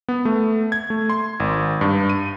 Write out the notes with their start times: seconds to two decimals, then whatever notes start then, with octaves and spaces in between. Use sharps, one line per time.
0.08 B3
0.25 A3
0.72 G#6
0.90 A3
1.10 C6
1.40 G#1
1.81 G2
2.10 D#7